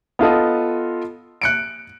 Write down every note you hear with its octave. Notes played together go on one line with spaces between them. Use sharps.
B3 F4 A4 D#5
F#6 C#7 D7